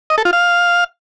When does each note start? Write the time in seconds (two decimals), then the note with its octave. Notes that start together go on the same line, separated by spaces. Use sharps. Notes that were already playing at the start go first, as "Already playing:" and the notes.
0.10 D#5
0.18 A4
0.25 F4
0.33 F5